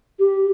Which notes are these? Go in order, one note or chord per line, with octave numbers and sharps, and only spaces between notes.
G4